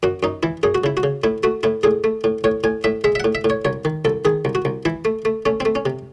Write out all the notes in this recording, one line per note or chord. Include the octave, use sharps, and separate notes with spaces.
F#2 F#4
F#2 D#4
E3 E4
F#2 G#4
F#4
C#3 E4
F#4
C#3
A2 E4
A3 F#4
A2 E4
A2 G#4
A3
A2
A2 C#5
A2 G#5
A2 E5
G#3 E5
E5
A2 F#5
E5
A2
C#5
C2 C#5
D#3
C2 A4
D#3 G#4
C2
F#4
C2
E3 E4
A3
A3
A3 C#4
C4
A3
C#4
C3